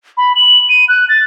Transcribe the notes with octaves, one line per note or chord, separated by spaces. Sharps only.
B5
F#7
D#7
F#6
A6